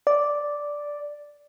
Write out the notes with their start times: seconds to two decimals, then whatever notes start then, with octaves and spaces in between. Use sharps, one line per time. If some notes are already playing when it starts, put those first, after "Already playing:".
0.07 D5